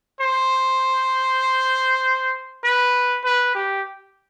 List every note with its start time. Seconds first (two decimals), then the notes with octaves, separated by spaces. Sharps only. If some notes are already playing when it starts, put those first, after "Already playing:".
0.20 C5
2.64 B4
3.24 B4
3.55 G4